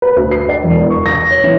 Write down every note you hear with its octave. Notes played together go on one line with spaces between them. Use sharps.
B4
D2
C7
D5
E1
E2
C#6
A#6
A#6
C#5
E3